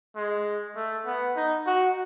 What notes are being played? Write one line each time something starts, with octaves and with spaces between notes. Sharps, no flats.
G#3
A3
B3
D#4
F#4